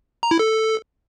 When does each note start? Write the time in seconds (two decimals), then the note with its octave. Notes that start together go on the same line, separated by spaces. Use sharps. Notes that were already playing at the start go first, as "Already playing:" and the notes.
0.23 A#5
0.31 E4
0.39 A4